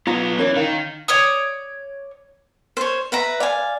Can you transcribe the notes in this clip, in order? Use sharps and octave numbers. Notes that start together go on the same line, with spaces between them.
F#3 B3 F4 A#5
E3 C#4 A#4 D5
D#3 F5
C#5 D5 D#6
C5 C#5
B4 E5 A#5
D5 F5 G#5